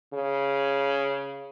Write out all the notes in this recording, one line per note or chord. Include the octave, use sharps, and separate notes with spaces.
C#3